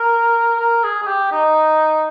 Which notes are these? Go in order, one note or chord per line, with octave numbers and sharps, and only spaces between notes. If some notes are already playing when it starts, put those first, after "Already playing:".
Already playing: A#4
A#4
G#4
G#4
G4
D#4